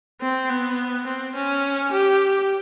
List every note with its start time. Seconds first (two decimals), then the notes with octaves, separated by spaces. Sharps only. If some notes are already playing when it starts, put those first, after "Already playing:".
0.21 C4
0.50 B3
1.06 C4
1.35 C#4
1.91 G4